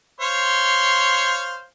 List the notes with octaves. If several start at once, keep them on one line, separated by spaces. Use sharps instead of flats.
C5 C#5 F5 C6